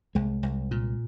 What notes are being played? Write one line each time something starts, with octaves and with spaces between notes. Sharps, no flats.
C2 G#3
C2
A#2